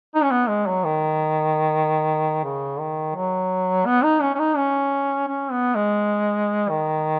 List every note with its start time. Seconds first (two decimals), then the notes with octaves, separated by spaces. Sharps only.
0.15 D#4
0.23 C#4
0.31 B3
0.49 G#3
0.67 F#3
0.84 D#3
2.44 C#3
2.79 D#3
3.15 F#3
3.86 B3
4.04 D#4
4.21 C#4
4.35 C#4
4.39 D#4
4.57 C#4
5.28 C#4
5.52 B3
5.75 G#3
6.69 D#3